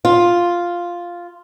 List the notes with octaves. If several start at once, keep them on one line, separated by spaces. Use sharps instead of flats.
F4